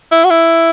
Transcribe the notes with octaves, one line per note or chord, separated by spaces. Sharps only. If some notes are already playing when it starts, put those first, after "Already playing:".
E4
F#4
E4